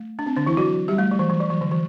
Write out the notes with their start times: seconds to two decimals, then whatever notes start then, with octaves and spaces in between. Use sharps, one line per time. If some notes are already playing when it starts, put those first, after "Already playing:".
Already playing: A3
0.19 D4
0.26 C4
0.37 D3 D4
0.46 E3 E4
0.57 F#3 F#4
0.88 G3 G4
0.98 A3
1.11 F#3
1.19 E3
1.30 E3
1.40 F#3
1.50 E3
1.61 D3
1.71 E3